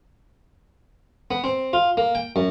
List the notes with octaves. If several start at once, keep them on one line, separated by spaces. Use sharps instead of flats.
B3
C4
F4
A#3
G5
F#2